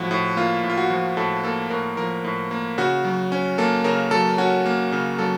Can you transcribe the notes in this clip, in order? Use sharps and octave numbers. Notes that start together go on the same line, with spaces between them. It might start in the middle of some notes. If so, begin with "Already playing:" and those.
Already playing: A2 F3 F#4
A2
A#3 F4
A2
F4
F#4
F3
A2 A4
A#3 A4
A2 A#4
F3 A#4
A2
A#3
C#3 F#4
F#3
C#4
A#3 A4
C#3 A#4
F#3 A4
C#4 F#4
A#3
C#3
F#3 A4